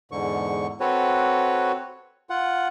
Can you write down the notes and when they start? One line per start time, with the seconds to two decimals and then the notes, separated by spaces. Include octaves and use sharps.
0.12 E2 G#2 D3 C#6
0.80 C4 F#4 A4 B4 C#5
2.30 F4 F#5